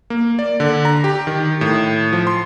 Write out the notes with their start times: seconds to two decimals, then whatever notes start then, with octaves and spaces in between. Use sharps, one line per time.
0.10 A#3
0.39 D5
0.60 D3
0.85 A#5
1.04 G4
1.27 D#3
1.61 A2
2.13 F3
2.27 C6